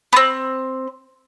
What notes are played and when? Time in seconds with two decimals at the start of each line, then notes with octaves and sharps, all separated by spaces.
0.13 B3 C4